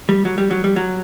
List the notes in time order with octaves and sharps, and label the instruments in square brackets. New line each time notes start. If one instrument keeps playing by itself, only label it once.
[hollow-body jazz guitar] G3
F#3
G3
F#3
G3
F#3